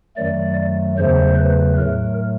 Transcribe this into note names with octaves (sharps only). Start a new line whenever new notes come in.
F#2 D#3 F#3 A3 D5
E2 C#3 F#3 A3 C5
B4
A2 F#3 A3 A#4